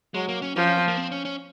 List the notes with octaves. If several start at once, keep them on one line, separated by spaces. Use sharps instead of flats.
F#3 G#3
A#3
C#4
F3 C#4
C#4
C4
A#3
C4
C#4
C#4